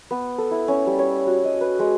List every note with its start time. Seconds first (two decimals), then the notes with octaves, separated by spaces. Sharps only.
0.11 B3
0.38 A4
0.51 E4
0.68 C#4
0.87 G3
0.99 C#5
1.27 F#4
1.44 D#5
1.61 B4
1.79 G#3